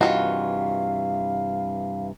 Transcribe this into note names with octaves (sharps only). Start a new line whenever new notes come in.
G2 C3 D#3 E3 F4 F#4 F5